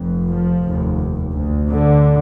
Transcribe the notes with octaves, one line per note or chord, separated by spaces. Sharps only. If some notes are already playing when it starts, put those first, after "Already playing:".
Already playing: F1 F2
F3
F1 D#2
D2
D3